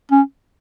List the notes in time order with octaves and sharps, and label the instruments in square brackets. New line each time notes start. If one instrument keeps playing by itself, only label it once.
[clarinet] C#4